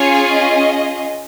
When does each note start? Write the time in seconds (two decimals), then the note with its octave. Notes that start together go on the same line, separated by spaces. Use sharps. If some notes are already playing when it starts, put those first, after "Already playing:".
Already playing: C#4 F4 G#4 C#5
0.35 D#5